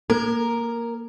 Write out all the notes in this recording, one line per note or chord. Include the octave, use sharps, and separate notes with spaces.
A#3 A#4